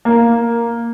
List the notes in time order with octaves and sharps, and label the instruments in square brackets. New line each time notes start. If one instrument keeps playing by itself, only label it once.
[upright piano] A#3